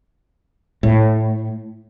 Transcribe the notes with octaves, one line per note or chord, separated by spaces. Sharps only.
A2